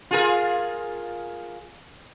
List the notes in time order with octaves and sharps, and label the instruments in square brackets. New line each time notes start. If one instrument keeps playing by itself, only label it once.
[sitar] F4 G#4 A#4